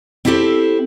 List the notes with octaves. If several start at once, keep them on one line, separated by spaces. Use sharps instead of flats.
C4 E4 G4 A4 C5